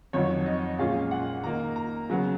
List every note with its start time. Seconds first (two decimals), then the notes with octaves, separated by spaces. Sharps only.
0.13 F2 D#3 F#3 C#5
0.46 D#5
0.79 A#2 G#3 C#4 F5
1.11 F#5
1.43 D#3 A#3 D#4 A#5
1.76 A#5
2.09 C#3 F#3 B3